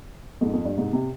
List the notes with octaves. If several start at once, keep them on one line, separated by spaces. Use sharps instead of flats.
F2 G#2
F2
G2
G#2 C3
C3